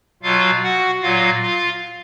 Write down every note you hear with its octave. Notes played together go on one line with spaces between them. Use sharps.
B2 F#3 F4 F5
F#4 F#5
A#2 F#3 F4 F5
F4 F5